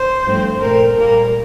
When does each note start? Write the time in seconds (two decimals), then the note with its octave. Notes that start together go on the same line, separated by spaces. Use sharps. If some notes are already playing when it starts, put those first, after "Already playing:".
Already playing: C5
0.26 G2 F3 A3 C4
0.61 A#2 A3 C4 A#4
0.96 A#2 G3 A#3 A#4